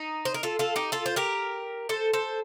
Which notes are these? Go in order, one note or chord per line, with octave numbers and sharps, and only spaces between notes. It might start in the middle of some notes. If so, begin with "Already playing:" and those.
Already playing: D#4
C5
A#4
F4 A4
F4 A4
D#4 G4
F4 A4
C5
G4 A#4
A4 C5
A4 C5